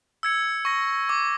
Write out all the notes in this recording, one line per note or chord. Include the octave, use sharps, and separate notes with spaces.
E6 G#6 C#7
C#6 A#6
D6